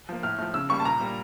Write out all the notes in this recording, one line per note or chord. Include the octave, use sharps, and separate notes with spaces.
F3 A#3
A2 F6
F3 A3
C#3 E6
G3 A#3 C#6
A5
A#2 A#5
G3 A#3